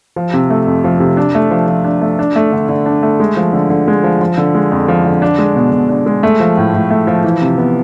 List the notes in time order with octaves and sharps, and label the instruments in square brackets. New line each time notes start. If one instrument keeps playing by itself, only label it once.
[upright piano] F3
C3
A3
F2
F3
C3
D4
A3
F3
F3
D4
A3
D4
A3
D3
D3
D4
A3
G#3
F3
D3
D3
G#3
F3
F3
D3
G#3
F2
F3
D3
D4
G#3
B2
B2
D4
G#3
A3
F3
A2
A2
A3
F3
E3
C3
B3